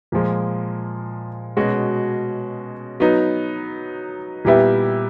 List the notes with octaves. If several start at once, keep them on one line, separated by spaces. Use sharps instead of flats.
A#2 F3 G#3
B2 G#3 C#4 F#4
F#3 B3 D#4
A#2 G3 B3 E4 G4